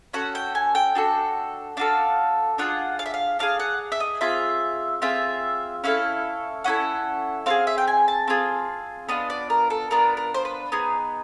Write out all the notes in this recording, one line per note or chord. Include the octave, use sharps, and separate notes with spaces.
C#4 F#4 A4 F#5
G5
G#5
G5
D4 F#4 A4
D4 F#4 A4 F5
D4 F4 G#4 F#5
F5
E5
F5
D4 F4 G#4 F5
F#5
E5
D#5
C4 F4 G#4 E5
C4 F4 G#4 E5
C#4 E4 A4 F5
C#4 E4 A4 F#5
C4 F4 G#4 F5
E5
G5
G#5
A5
C4 F4 G#4
B3 D4 F4 D#5
D5
A#4
A4
B3 D4 F4 A#4
A#4
C5
B4
B3 D#4 G#4